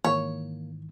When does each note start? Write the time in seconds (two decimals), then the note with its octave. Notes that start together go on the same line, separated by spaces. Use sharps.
0.04 G#2 D#3 E3 A#3 C#5